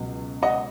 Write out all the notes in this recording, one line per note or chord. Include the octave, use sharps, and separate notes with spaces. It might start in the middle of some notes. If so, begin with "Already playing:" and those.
Already playing: C#2 B2 F#3
D#5 F#5